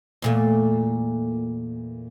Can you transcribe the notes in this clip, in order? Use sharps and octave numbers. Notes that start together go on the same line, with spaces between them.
E2 A#2 A3